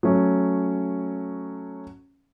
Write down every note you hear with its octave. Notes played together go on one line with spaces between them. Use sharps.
F#3 A3 C#4